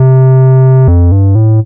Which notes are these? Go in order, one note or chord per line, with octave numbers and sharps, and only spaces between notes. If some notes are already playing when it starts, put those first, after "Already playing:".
Already playing: C3
F2
G2
A2